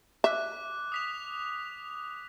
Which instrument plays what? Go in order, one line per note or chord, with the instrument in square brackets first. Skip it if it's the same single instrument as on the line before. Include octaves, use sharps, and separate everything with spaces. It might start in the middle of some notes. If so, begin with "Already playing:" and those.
[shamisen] E5 [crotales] D6 F#6
[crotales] D#6 B6 F7